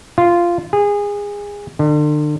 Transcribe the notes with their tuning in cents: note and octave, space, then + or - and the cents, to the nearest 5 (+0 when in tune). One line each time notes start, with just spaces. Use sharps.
F4 -10
G#4 -25
D3 +35